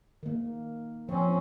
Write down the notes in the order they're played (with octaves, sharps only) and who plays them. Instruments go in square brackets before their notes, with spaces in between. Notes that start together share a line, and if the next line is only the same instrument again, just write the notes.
[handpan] D#3 A#3
[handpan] F3 [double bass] C4 C#4